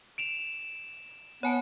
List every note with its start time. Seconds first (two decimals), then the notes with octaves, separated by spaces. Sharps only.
0.18 D7 E7 F7
1.43 B3 C#5 G#5 A5